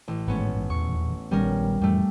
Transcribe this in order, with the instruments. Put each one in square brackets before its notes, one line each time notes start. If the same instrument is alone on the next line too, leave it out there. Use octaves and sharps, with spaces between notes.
[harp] A1
[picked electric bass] G#1 A2 G#3 [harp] B3 C#4
[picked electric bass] A1 G#2
[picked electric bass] D#1 A#1 E2 [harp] C#6
[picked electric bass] A#1 D#3 B3 [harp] G3 C#4 A#4
[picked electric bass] F2 A2 E3 [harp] G3 A3